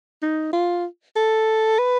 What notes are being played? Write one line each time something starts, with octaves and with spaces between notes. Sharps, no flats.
D#4
F4
A4
B4